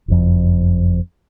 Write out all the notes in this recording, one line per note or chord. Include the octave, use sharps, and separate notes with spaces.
F#1 F2